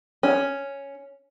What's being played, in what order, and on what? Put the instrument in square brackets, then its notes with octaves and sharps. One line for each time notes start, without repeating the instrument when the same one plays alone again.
[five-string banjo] C#4